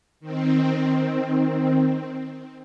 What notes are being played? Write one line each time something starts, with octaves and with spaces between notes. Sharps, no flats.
D#3 C4